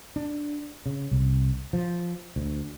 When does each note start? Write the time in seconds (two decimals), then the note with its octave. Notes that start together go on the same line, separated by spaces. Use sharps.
0.16 D4
0.86 C#3
1.11 C2
1.73 F3
2.36 D2